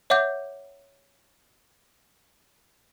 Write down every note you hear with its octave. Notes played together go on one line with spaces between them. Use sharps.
C#5 E5 F#5 D6 G6